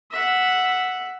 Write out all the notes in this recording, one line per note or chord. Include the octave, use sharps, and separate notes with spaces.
E5 F#5